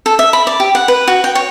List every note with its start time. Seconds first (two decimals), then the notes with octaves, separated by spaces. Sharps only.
0.06 A4
0.19 E5
0.33 B5
0.47 D5
0.60 G4
0.75 F#5
0.88 B4
1.08 F#4
1.24 G5
1.35 C#5